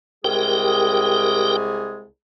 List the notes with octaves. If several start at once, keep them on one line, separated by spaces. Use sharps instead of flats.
C2 G#3 G4 G#4 A#4 G5